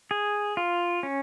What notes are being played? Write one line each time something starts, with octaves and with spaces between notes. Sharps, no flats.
G#4
F4
C#4